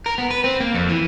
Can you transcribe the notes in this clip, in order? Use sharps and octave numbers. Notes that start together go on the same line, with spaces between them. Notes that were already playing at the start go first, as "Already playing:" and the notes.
A#4
B3
B4
C4
A#3
F2
E3